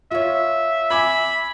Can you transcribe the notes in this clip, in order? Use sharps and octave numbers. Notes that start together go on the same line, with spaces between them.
F4 C#5 E5
G#5 B5 D6 G#6